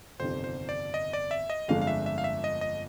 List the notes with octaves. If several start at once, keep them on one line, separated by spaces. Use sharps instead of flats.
G1 F2 C3 D#3 C5
C5
D5
D#5
D5
E5
D#5
G1 F2 D3 F3 G#3 F5
F5
E5
E5
F5
E5
D#5
D#5